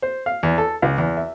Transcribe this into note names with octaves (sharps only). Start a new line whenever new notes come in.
C5
F5
E2
A4
C#2
E2
E5